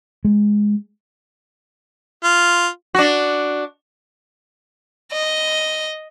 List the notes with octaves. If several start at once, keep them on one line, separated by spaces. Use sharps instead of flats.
G#3
F4
D4 F#4
D#5